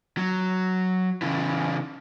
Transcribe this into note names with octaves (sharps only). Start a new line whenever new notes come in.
F#3
C#3 E3